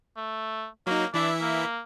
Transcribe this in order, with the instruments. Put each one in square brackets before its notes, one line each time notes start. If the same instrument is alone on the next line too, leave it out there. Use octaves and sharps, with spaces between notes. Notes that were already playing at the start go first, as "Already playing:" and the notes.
[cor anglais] A3
[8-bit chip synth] F#3 D#4 [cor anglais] A#3
[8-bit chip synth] E3 E4 E5 [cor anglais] D4
[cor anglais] A#3